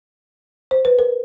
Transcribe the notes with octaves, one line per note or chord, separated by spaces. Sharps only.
C5
B4
A#4